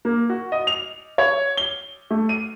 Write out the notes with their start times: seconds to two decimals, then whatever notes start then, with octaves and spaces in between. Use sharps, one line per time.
0.05 A#3
0.29 F#4
0.52 D#5
0.67 F7
1.18 C#5
1.57 G7
2.11 A3
2.29 D#7